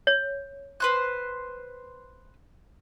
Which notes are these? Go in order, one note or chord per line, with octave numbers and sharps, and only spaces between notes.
C#5
B4 C5 F#6